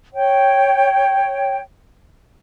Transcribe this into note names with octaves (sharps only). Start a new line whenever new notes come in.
C#5 G5